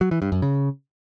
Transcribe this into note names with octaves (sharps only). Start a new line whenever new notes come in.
F#3
E3
G2
F#2
C#3